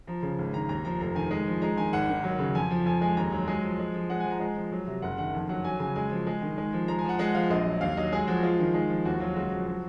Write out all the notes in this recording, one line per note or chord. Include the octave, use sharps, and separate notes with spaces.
F3 A#5
C#3
G#1
D#3 A#5
D#2 A#5
F3 A#5
F1 A#5
D#3 G#5
G#3
F3
G#3 A#5
D#3 G#5
G#1 F#5
D#3
F#3
C#3
F2 G#5
F3 G#5
F2 G#5
G#3 G#5
D#2 A#5
F#3
G#3 G#5
F3
G#3
F3
G#3 F#5
G#5
F3 A#5
G#3
F3
F#3
C3
F#1 F#5
D#3 F#5
F2
F#3 F#5
F#3 G#5
C#3 G#5
G#3 G#5
F3
G#3
D#3
G#3
F3
G#3 A#5
G#5
F3 F#5
G#3 F#5
F3 F5
A#1 D#5
F#3
D#2 F5
F#3 D#5
G#3 G#4
F3 F#4
G#3 F4
D#3
G#3
F3
D#2 F#4
F#3 F4
C#2 F#4
F3
F#3